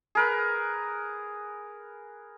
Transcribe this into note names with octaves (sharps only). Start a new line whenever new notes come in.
G#4 A#4 B4